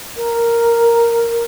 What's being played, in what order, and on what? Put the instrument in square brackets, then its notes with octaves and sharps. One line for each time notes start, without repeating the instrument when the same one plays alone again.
[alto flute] A#4